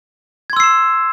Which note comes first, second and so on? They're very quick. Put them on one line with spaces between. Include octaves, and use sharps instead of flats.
G#6 C6 E6 C7 E7